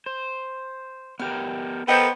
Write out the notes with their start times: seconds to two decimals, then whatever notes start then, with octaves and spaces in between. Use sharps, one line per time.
0.06 C5
1.20 B3 G4 A#4 F6
1.88 B3 A4 A#4 C5 D#5 G5